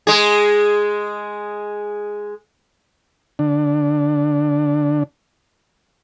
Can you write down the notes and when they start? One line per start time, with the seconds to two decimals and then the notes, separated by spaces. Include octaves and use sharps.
0.07 G#3 G#4
3.39 D3 D4